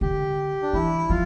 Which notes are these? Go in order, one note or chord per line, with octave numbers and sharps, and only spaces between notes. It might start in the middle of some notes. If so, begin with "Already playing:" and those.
D3 G4
D4
E3 E4
F3 F4